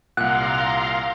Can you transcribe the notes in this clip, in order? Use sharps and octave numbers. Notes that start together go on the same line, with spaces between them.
C2 A#2 F5 F#5 A#5 C6